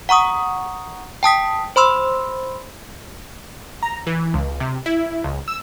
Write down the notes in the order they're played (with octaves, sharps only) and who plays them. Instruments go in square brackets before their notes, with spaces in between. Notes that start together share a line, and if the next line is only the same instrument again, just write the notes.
[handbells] F#5 A#5 C#6 D#6
G5 A5 D#6 B6
C5 B5 C6 E6
[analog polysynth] A#5
E3
C#2
C3
E4
C#2
E6